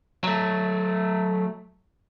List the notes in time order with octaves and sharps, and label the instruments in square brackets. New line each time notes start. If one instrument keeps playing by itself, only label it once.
[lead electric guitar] F#3 A3